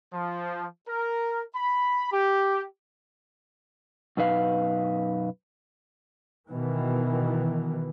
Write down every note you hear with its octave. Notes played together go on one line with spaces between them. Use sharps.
F3
A#4
B5
G4
F#2 B2 D#4 B4 F5
B2 D#3 E3